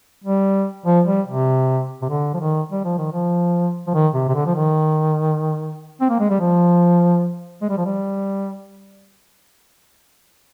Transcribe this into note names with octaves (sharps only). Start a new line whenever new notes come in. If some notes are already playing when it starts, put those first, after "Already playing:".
G3
F3
G3
C3
C3
D3
F3
D#3
G3
F3
D#3
F3
F3
D#3
C3
C3
D3
F3
D#3
C4
A#3
G#3
G3
F3
G#3
G3
F3
G3